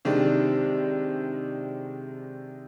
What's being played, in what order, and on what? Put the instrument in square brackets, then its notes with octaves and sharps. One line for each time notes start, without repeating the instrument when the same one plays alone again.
[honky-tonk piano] C3 D#3 G#3 D4